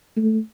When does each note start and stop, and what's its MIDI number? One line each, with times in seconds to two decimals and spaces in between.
0.16 0.38 57